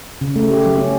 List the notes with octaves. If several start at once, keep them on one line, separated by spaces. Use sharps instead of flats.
C#3
A3
G4
F#3
C#4